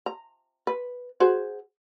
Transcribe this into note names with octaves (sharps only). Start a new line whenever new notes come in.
A#5
B4
F#4 G#4 C5